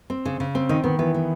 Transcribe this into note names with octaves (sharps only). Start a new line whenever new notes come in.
C4
C#3
C#3
C4
D#3 D#4
D#3 B3
E3 B3
B3